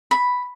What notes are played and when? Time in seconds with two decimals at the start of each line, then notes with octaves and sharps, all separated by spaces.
0.11 B5